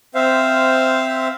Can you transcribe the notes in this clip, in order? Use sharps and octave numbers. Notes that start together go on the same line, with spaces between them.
C4 C5 E5 F5